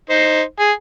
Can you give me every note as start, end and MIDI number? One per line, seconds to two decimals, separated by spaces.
0.10 0.41 63
0.10 0.41 72
0.60 0.71 68